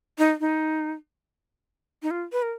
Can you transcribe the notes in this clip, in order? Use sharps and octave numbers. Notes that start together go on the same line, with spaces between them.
D#4
D#4
D#4
F4
B4
A#4